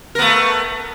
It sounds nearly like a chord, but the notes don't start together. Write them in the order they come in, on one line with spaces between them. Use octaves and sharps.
A#4 B3 A3